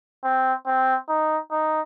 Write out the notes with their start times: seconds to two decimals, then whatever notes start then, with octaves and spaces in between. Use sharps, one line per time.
0.24 C4
0.66 C4
1.09 D#4
1.51 D#4